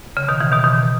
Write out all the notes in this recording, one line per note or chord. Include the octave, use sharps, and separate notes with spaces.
C#3
B2 D#3
C#3 E3
B2 D#3
B2 D#3